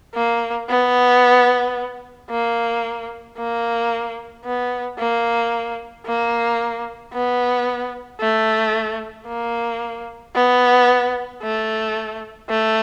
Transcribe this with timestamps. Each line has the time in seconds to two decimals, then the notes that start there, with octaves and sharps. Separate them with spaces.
0.15 A#3
0.69 B3
2.30 A#3
3.38 A#3
4.45 B3
4.98 A#3
6.06 A#3
7.13 B3
8.21 A3
9.28 A#3
10.35 B3
11.42 A3
12.49 A3